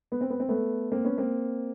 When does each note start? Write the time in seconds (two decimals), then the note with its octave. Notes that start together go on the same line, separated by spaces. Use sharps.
0.12 B3
0.21 C4
0.30 B3
0.40 C4
0.49 A3 B3
0.92 A#3 C4
1.05 B3 C#4
1.18 A#3 C4